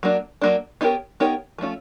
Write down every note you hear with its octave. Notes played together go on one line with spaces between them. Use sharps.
F#3 A#3 D4
F#3 A#3 D4
B3 D#4 G4 A#4 C#5
B3 D#4 G4 A#4 C#5
F3 A3 C#4 F4